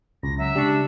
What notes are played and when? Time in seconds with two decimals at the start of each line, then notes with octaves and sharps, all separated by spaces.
0.23 C#2 A#6
0.38 F#3 E5
0.55 C#3 G3 G#3 D4 C#6